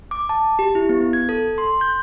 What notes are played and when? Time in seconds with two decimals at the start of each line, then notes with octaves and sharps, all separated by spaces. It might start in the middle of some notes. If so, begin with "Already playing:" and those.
0.11 D6
0.29 A5
0.59 G4
0.75 E4
0.89 B3
1.13 G#6
1.29 A4
1.58 C6
1.81 G6